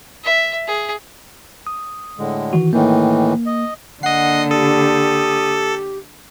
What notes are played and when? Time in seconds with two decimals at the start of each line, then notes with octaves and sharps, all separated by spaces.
0.24 E5
0.67 G#4
1.67 D#6
2.19 A2 D3 G#3
2.53 D#3 E3 F#4
2.73 A2 D#3 E3 A#3
3.46 D#5
4.03 D3 A#3 D#5 F#5 C7
4.51 G4 A4 D#6